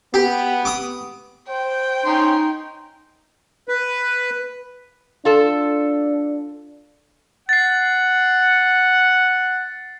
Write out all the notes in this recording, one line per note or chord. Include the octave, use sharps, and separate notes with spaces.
B3 G4
D6 D#6
C5 G5
C#4 D#4 C6
B4
D4 F4 A4
F#5 A6 C7